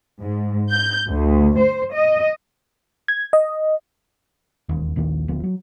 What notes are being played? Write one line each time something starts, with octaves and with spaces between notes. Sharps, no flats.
G#2
G6
D2
C5
D#5
G#6
D#5
E1 D#2
A#1 D#2 D#3 A#3
D1 D2 F3 B3
F#3